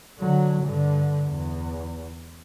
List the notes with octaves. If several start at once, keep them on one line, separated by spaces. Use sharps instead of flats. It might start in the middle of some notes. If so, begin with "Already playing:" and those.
D3 F#3
G2 D3
E2